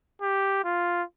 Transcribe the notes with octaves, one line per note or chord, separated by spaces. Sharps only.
G4
F4